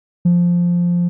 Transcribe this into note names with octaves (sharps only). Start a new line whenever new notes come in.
F3